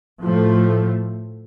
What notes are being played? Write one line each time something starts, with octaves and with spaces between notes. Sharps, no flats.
A2 F3 A3